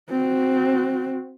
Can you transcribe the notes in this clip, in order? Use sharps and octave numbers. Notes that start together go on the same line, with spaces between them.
C4 F#4